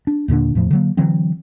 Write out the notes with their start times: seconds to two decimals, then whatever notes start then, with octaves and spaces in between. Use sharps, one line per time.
0.07 D4
0.28 D#2 A#2 D3 D4
0.55 E2 A2 F3 A3
0.71 D3 F#3 A#3
0.97 D3 E3 F#3 C4